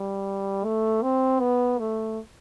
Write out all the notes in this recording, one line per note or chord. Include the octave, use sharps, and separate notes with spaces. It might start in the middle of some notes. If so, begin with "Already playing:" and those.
Already playing: G3
A3
C4
B3
A3